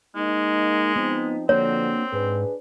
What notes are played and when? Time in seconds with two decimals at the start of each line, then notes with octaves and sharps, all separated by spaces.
0.16 G#3 A#3 D#4
0.96 F3 B3 C4 D#4
1.49 D3 F3 A#3 C4 D4 F#4 C#5
2.13 G#2 D4 G#4 B4